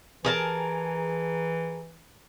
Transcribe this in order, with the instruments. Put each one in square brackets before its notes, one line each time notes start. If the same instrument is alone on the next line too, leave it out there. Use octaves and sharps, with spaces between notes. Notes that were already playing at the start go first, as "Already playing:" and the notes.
[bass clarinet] E3 [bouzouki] G#4 A#4 A5